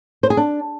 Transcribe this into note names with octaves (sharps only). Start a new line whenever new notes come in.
C5
G#4
D4